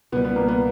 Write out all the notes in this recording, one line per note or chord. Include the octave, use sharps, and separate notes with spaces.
C#2 B2 G3 B3
B3
A#3
B3